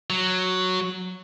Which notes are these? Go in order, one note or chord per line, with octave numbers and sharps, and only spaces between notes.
F#3